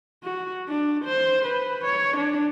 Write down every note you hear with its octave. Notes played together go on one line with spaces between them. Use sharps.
F#4
D4
C5
B4
C#5
D4